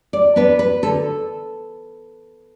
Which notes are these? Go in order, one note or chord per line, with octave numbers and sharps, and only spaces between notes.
D5
B3 D4 B4
B4
D3 A4